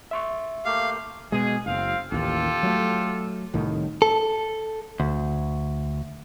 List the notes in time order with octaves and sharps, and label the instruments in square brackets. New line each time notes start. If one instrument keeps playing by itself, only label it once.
[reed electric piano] E5 C6 C#6
[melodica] A3 A#3 G4 [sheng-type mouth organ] F5
[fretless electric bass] B2 G#3 [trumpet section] G#4
[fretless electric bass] F#1 [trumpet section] C4 F5
[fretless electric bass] A1 D#2 [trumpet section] F4 G4 A4
[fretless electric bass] F#3 A3
C2 A2 D#3
[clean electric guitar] A4
D2